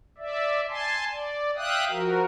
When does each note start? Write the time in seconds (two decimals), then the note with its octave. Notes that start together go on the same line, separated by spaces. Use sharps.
0.18 D5 E5
0.69 G#5 A5 C6
1.11 D5
1.57 E5 F5 G5 D#6 F#6
1.89 F3 F#4 A#4